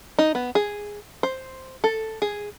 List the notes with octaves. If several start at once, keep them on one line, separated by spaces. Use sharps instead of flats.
D#4
B3
G#4
C5
A4
G#4